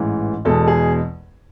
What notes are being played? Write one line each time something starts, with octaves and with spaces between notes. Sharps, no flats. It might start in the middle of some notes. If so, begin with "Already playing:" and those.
Already playing: A1 G#2 E3
E2 B2 G#3 A4
G#4